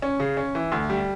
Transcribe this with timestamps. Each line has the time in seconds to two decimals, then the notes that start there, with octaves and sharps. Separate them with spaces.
0.02 C#4
0.20 C#3
0.37 C#4
0.55 E3
0.72 D2
0.90 G3